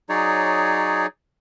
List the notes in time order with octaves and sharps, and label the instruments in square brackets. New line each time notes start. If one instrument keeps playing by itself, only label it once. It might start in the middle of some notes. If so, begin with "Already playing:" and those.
[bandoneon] F#3 D#4 G#4 C#5 D5